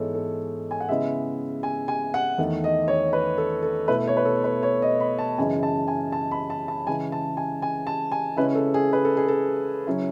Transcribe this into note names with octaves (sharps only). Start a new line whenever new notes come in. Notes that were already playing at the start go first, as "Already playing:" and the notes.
Already playing: G#2 E3 G#3 B3 D#4 A4 C#5
A4
G#5
F#5
C#3 G#3 B3 E4 E5
G#5
G#5
F#5
E2 D#3 A3
D#5
C#5
B4
A4
A4
B2 A3 E4 B4
C#5
B4
A4
B4
C#5
D#5
B5
A5
F#2 C#3 E3 G#3 D#4 G#5
A5
G#5
A5
B5
A5
A5
C#3 E3 G#3 G#5
A5
G#5
G#5
A5
G#5
C#3 G#3 C#4 E4 B4
A4
G#4
B4
A4
G#4
A4
C#3 F#3 C#4 E4